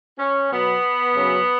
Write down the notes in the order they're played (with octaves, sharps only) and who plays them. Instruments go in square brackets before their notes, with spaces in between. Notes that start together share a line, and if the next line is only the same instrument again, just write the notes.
[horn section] C#4
B2 F#3 B3
F#2 C#3 F#3